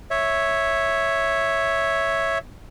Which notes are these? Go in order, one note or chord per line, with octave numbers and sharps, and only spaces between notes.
C#5 E5